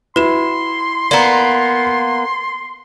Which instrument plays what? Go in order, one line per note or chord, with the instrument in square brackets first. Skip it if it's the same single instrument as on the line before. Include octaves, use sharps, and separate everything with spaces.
[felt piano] E4 F#4 [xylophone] B4 E7 [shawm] C6
[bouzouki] A#3 B3 [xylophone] D5 A#5